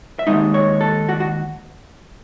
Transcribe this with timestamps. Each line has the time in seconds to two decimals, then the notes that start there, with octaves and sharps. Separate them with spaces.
0.19 E5
0.27 D#2 C#3 G#3 D#4 D#5
0.54 C#5
0.81 A4
1.09 F#4
1.20 F#4